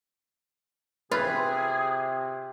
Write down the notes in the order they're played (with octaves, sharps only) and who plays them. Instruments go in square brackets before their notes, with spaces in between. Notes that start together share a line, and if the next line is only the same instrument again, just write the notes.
[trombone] C3 [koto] F4 [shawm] G#4 [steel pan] B4